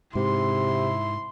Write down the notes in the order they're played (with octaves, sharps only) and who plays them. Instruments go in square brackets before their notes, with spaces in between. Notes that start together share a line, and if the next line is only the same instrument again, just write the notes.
[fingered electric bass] G#2 [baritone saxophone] C3 [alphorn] E4 [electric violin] C6